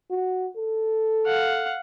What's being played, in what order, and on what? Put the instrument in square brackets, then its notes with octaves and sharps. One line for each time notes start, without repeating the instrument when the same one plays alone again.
[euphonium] F#4
A4
[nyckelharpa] F5 F#5